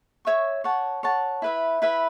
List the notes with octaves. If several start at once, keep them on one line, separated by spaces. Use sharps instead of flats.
C#5 E5 C#6
C#5 F#5 A5
C#5 F#5 A5
E4 B4 E5
E4 B4 E5